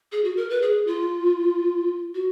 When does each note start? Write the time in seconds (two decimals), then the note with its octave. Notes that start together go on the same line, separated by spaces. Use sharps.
0.12 G#4
0.24 F#4
0.37 A#4
0.50 B4
0.62 G#4
0.87 F4
2.15 F#4